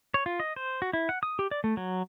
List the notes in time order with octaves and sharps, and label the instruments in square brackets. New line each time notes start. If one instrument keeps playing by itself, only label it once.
[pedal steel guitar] C#5
F4
D#5
C5
F#4
E4
F#5
D#6
G4
D5
A3
F#3